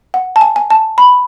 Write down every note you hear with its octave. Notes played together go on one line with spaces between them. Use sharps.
F#5
A5
G#5
G#5
A5
B5